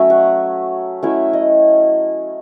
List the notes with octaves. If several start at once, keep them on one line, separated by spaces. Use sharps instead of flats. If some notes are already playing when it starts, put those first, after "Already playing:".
Already playing: F#3 A3 C#4 E5
F#5
F#3 A3 C#4 E4 E5
D#5